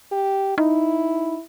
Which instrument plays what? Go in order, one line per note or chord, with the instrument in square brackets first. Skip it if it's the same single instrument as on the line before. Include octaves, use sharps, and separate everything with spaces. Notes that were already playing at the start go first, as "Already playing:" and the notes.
[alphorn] G4
[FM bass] D#4 [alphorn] E4